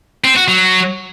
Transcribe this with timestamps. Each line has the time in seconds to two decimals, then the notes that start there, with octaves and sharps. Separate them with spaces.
0.24 C4
0.36 F#4
0.48 F#3